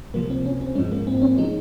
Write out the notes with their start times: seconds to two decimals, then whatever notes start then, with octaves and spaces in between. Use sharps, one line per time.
0.14 C#2 C3 F3 A#3
0.30 C4
0.46 C#4
0.61 C4
0.75 G#3 C#4
0.78 G#2 F3
0.92 A#3
1.07 C4
1.22 C#4
1.38 F3 G#3 D#4